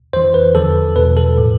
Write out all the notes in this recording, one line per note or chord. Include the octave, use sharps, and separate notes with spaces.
F2 E3 C5
B4
E2 D3 F3 A4
E2 B2 B4
A4
A2 F3